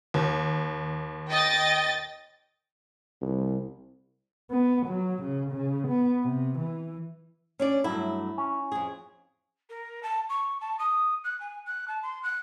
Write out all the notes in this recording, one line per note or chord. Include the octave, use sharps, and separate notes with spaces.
D#2
D#5 G5 A6
C2
B3
F#3
C#3
C#3
B3
C3
E3
C#4 D4 D5
G2 F#3 A3 E4
C#4
F2 G#4
A#4
A5
C#6
A5
D#6
F#6
G#5
F#6
A5
C6
F#6